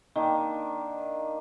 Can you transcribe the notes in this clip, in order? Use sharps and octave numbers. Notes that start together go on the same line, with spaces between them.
D#3 A#3 D4